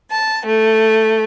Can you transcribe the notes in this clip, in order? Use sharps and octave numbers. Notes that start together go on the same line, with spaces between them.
A5
A3